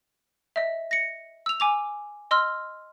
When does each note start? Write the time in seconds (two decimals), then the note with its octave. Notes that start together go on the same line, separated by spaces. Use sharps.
0.56 D#5 E5
0.91 A#6 C#7
1.46 E6 F7
1.60 G#5 D6 F7
2.31 D#5 C6 E6 F6